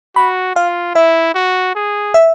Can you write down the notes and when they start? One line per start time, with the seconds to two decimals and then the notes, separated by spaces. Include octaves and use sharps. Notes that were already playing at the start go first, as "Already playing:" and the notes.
0.16 F#4 B5
0.56 F4 F5
0.95 E4 E5
1.35 F#4
1.75 G#4
2.14 E5